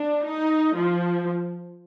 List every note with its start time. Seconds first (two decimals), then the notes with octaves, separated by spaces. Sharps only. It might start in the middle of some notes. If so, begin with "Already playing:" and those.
Already playing: D4
0.24 D#4
0.74 F3